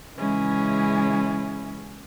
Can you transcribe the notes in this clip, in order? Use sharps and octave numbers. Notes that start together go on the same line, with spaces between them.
C#3 E3 G#3 C#4 E4 G#4